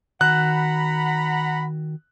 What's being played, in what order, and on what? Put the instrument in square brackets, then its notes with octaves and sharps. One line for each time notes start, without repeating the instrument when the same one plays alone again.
[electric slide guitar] D#3 F#4 [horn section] F#5 A#5 B5 [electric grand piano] F#6